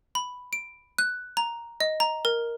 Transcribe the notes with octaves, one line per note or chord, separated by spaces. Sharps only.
B5
D7
F#6
A#5
D#5
A#5
A#4